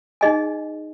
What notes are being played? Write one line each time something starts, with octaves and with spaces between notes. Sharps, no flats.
D#4 G#4 D#5 G#5